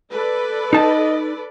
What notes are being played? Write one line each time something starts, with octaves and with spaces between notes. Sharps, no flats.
A4 B4 D5
D#4 D#5 A5